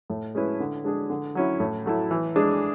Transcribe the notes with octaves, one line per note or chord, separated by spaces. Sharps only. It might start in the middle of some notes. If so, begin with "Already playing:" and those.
A2
G#3 C#4 E4 B4
D3
G#3 D4 G#4
D3
F#3 C#4 E4
A2
F#3 A3 E4
E3
G#3 D4 G#4